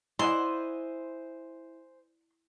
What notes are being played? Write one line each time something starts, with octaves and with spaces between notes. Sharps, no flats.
E4 C5 D5 D#5 F#5 G#5 C6